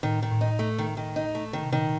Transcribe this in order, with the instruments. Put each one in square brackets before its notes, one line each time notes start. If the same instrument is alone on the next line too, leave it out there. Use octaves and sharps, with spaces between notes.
[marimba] A2 [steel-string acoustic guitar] D#3
[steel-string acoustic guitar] D#3
[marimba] A2
[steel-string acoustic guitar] D#4
A3
D#3
D#3
D#4
A3
D#3
[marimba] C3
[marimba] A#2 [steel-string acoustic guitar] D#3